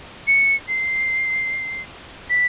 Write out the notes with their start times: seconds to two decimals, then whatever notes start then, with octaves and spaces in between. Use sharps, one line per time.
0.27 C#7
0.68 C7
2.30 B6